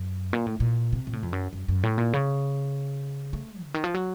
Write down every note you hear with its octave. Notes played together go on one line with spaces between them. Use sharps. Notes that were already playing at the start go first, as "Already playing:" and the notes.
Already playing: F#2
A#2
A2
A#2
C3
A#2
A2
F2
F#2
F#2
F#2
A2
A#2
C#3
A3
C#3
D#3
F3
F#3